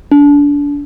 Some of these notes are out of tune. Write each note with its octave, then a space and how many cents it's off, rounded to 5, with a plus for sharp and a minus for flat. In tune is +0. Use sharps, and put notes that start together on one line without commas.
D4 -30